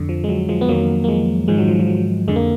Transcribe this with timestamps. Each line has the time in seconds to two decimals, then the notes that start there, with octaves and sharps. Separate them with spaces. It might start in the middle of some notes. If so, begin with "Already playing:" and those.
Already playing: F2 D3
0.09 F3
0.24 G#3
0.29 F#3
0.49 F3 G#3
0.61 B3
0.68 F2 D#3 F#3 A#3
1.04 A#3
1.08 F3 G#3
1.48 G#2 D#3 F3 G#3
1.58 F#3
1.68 F3
1.80 F3
1.88 F#3
2.28 F2 D3 G#3
2.36 A#3